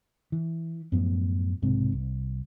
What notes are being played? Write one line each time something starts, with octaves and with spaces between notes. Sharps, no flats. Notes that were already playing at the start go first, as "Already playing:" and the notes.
E3
F#2 A2 F3 B3
B1 G#2 C3
C2